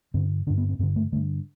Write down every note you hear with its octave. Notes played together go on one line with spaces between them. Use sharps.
G2 D3 C4
G2 D3 D4
B3
C4
G2 D3 C4
A3
G2 D3 A3